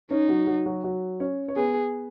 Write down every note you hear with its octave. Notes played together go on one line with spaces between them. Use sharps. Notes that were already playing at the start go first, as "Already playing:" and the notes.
C#4 D#4 C#5
F#3 F#4
F#3 F#4
F#3 F#4
F#3 F#4
C#4 C#5
C#5
B3 G#4 B4